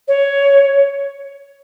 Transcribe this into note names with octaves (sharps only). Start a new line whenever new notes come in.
C#5